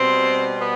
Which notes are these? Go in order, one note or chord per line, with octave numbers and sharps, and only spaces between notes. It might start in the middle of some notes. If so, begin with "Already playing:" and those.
Already playing: B2 G3 C4
B3